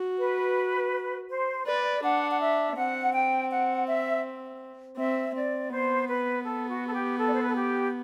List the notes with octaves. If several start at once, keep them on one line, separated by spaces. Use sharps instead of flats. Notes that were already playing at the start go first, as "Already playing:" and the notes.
Already playing: F#4
B4
C5
B4 D5
D4 F#5
F#5
E5
C4 F#5
G5
F#5
E5
C4 E5
C4 D5
B3 C5
B4
A4
F#4
A4
G4
A4
D5
C5
B4
A4
G4